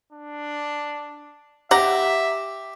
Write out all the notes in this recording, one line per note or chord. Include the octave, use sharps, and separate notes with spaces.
D4
G4 E5 F#5 A#5